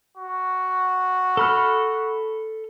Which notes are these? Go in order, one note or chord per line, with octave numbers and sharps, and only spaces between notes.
F#4
A4 B5 F6